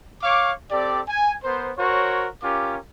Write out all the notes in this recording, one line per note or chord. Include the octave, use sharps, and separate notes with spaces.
C#5 F5 C#6 D6
C4 G4 A4 D5
G#5
B3 A#4 C5
F#4 A#4 C5 C#5
C#4 F4 G4 A#4 D6